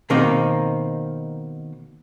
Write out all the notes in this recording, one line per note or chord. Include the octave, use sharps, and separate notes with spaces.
B2 D#3 A#3 C4 D#4